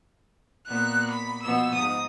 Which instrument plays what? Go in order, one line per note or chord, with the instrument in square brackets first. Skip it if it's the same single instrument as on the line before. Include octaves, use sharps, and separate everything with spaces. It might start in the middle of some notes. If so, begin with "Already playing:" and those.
[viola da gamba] A#2 B3 [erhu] F#6
[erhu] B5
[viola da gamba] B2 F3 B3 [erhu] E6
[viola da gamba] G#2 [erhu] D#6